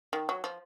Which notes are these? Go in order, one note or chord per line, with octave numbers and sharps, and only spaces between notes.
D#3
F#3
F3